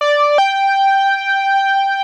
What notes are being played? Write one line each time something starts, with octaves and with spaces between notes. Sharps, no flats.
D5
G5